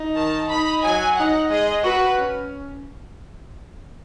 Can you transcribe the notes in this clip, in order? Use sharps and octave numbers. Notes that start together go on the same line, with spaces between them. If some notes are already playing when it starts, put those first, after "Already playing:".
Already playing: D#4
D#3 A5
D#4 B5
F#3 G#5
D#4 F#5
G#3 D#5
F#4 B4
C#4